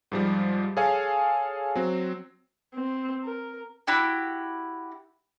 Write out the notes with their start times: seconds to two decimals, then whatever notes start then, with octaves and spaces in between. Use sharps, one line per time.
0.12 G#2 F3 G3
0.77 G#4 A4 C#5 F5 G#5
1.75 F#3 C4
2.75 C4
3.23 A#4
3.87 E4 F#4 G4